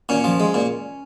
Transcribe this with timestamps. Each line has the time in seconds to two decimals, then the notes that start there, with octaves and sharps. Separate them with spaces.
0.09 A#2 C#4
0.24 F3
0.40 G#3
0.54 A#2